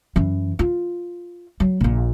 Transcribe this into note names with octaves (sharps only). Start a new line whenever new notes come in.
F#2 E3
F4
F#3
A#1 A#2